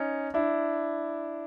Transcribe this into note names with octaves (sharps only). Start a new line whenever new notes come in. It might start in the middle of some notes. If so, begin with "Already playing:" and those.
Already playing: C#4 D#4
D4 E4